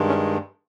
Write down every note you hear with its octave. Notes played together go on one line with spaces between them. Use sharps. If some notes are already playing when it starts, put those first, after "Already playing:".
Already playing: G2 D#3 G#3
C#4